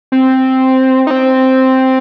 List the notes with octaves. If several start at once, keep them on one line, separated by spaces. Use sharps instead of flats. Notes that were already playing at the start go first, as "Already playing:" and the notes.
C4
D#4
C4